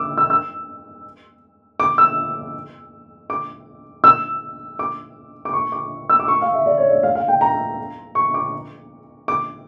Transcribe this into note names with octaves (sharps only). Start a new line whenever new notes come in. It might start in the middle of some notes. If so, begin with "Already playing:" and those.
Already playing: D6 E6
E6
E6
D6
E6
D6
E6
D6
D6
C#6
D6
E6
D6
C#6
F5
E5
D5
C#5
D5
F5
F5
G5
A#5
C#6
D6
D6